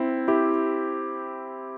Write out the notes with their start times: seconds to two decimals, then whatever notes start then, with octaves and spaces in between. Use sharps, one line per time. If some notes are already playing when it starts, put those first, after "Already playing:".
Already playing: C4 E4
0.28 E4 G4